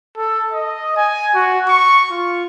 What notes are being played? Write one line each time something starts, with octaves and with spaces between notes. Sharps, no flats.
A4
D#5
G#5
F#4
C#6
F4